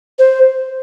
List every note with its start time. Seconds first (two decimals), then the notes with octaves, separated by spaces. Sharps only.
0.19 C5